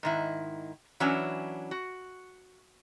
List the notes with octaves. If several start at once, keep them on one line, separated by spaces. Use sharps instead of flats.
G#2 D#3 E4
E3 F#3 C#4 D4 E4
F#4